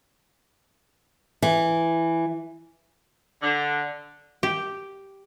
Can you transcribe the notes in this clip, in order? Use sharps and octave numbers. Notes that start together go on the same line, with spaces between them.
E3
D3
G4